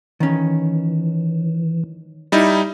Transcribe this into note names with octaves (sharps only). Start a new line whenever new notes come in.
D#3 E3 C#4
G3 D#4 E4